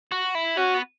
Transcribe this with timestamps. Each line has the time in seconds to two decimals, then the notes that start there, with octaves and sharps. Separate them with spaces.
0.12 F#4
0.35 E4
0.57 C#4 F#4
0.74 B3